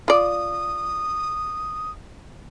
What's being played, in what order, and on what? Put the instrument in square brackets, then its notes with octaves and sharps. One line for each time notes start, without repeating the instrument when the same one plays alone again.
[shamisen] F4 D5 [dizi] D#6